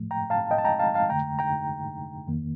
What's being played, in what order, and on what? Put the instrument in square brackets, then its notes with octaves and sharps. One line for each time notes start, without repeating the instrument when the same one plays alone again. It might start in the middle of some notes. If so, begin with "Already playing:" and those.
Already playing: [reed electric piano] A2 F3 A3
G5 A#5
F5 A5
D#5 G5
A5
G5 A#5
F5 A5
F5 A5
F2 D3 A3 G5 A#5
G5 A#5
F2 D#3 A#3